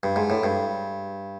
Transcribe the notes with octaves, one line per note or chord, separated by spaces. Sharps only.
G2
G#2
A2
G2